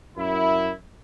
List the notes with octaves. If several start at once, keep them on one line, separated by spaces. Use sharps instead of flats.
F#2 E4